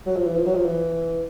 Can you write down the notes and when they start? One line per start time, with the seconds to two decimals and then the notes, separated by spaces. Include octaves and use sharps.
0.06 F#3
0.16 F3
0.26 E3
0.36 F3
0.46 F#3
0.55 F3
0.65 E3